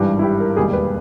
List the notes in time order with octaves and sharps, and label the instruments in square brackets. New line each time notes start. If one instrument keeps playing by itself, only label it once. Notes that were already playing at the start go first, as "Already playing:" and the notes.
Already playing: [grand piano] G#1 G2 E3 G3
E4
G4
A#4
E1 D#2 D#3 G3 G#4
B4